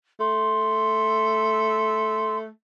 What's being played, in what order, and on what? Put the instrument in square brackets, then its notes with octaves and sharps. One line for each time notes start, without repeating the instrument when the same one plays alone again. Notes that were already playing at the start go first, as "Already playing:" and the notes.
[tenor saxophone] A3 [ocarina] C6